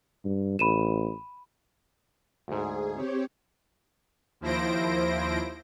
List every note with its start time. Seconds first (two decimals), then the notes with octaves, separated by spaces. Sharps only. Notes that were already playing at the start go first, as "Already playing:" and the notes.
0.25 G2
0.59 A1 B5 D#7 E7
2.48 D2 G#2 G#4
2.94 C4 G4 C#5
4.41 D#2 F3 E4 C5 A#6 D7